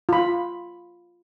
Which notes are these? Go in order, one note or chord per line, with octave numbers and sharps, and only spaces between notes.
F4 B5